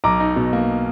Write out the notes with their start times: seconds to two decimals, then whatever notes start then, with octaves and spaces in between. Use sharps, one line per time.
0.04 B1 A#5 D6
0.20 D#4
0.36 B2
0.53 A#3